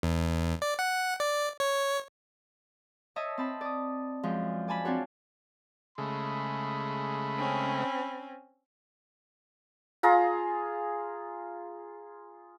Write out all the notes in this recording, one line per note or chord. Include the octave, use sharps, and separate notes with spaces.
E2
D5
F#5
D5
C#5
C#5 D#5 E5 A5
C4 A5 B5
D5 D#6
F#2 F3 G#3
D5 G#5 A5 B5
C4 D4 F4 F#4 C#5
C#3 G#3 A3 B5
C4 C#4
F4 G#4 A#5